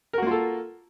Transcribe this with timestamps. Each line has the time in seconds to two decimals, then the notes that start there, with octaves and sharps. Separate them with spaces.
0.13 A#4
0.18 F#4
0.22 A#3
0.27 F4
0.31 A4